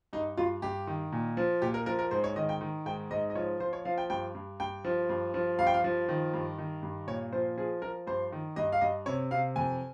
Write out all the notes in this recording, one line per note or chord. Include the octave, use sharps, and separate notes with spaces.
G2 D#4
G2 F4
G2 G4
D#3
A#2
F3
A#2 G4
A#4
F3 A#4
A#4
G#2 C5
C#5
D#3 D#5
G5
D#3
G#2 G5
G#2 D#5
D#5
F3 C#5
F3 C5
C#5
F3 F5
G5
G2 G5
G2
G2 G5
F3
G2
F3
G2 F5
G5
F5
F3
D#3
G2
D#3
G2
A#2 C#5
F3 C5
F3 G#4
F3 A#4
G2 C5
D#3
G2 D#5
F5
G2 D#5
C3 C#5
C3 F5
F2 G#5